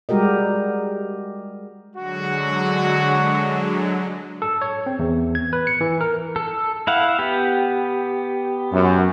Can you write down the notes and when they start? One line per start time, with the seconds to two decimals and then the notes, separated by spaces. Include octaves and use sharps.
0.09 G3 G#3 F#4 G4 A#4 D#5
1.95 D3 F#3 G#3 F#4
4.42 A4
4.62 C#5
4.86 C4
4.99 E2
5.35 G#6
5.53 B4
5.67 C#7
5.81 E3
6.01 A#4
6.36 A4
6.87 E4 F5 F#5
7.19 B3 G4
8.73 F#2